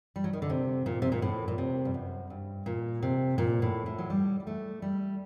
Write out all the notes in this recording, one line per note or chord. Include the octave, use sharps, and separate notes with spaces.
G3
F#3
D#3
D3
C3
A#2
C3
A#2
A2
A#2
C3
G2
F#2
G2
A#2
C3
A#2
A2
A2
F#3
G3
G3
A3
G3